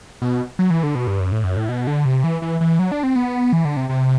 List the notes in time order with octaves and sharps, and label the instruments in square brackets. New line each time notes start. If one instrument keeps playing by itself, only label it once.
[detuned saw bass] B2
F#3
E3
D3
B2
G2
F#2
A2
F#2
A2
B2
D3
C3
E3
E3
E3
F#3
D4
C4
B3
E3
D3
C3
C3